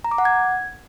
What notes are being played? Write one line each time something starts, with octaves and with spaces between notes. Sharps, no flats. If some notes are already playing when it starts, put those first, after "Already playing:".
A#5
D6
F#5
G#6